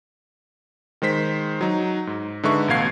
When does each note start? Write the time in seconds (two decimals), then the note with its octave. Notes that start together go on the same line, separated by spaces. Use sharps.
1.02 D#3 G#3 C5 B6
1.61 F#3 D#4
2.07 G#2
2.43 D3 G#3 D#4 B4 E5 C#6
2.68 A1 B2 A3 F5 G#6 C7